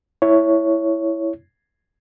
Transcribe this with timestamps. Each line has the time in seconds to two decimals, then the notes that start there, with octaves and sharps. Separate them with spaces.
0.22 E4 C#5